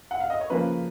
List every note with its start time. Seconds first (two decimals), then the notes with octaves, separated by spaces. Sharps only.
0.11 F#5
0.20 F5
0.30 D#5
0.40 C#5
0.50 C#3 F3 A#3 B4